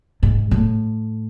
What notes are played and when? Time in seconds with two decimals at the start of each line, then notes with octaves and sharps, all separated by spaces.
0.23 G#2
0.51 A2